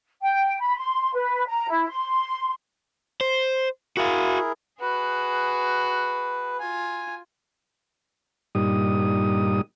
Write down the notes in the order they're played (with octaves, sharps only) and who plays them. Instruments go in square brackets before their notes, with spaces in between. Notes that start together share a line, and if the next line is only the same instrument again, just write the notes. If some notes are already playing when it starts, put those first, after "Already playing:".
[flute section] G5
B5
C6
B4
A#5
E4
C6
[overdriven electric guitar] C5
[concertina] E4 G#4 A#4 [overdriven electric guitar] F#4 F5
[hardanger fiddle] F#4 G#4 [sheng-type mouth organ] B4
[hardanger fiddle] F4 [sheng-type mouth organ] G#5
[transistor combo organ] G2 A#2 G3 D#4 D#6